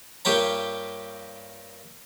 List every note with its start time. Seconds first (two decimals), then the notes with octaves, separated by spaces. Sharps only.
0.25 G2 A#3 F4 G4 C#5 A#5